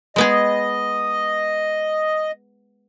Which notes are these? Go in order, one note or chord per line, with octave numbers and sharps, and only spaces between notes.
G#3 B3 G#4 D#5